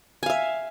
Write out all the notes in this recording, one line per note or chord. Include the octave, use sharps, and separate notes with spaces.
E5 F5 G#5